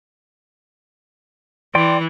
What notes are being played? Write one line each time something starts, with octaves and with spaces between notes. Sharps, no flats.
E3 D5 G5 C6